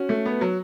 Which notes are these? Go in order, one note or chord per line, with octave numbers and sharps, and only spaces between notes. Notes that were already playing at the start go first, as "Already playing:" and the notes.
Already playing: C#4 F#4
A3
B3
F#3